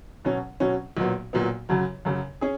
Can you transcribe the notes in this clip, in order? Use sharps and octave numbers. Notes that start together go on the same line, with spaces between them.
B2 F#3 C#4
B2 F#3 C#4
B1 A#2 F#3 B3
B1 A#2 F#3 B3
F#2 C#3 F#3
F#2 C#3 F#3
C#4 G#4